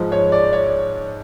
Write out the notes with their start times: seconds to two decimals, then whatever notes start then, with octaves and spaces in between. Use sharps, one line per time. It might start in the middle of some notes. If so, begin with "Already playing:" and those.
Already playing: G#2 F3 G#3
0.12 C#5
0.32 D5
0.53 C#5